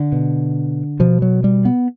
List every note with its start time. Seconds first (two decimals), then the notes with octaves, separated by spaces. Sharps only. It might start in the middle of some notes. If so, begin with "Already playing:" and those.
Already playing: D3
0.12 B2
1.00 B2 F3
1.22 F#3
1.44 G3
1.65 B3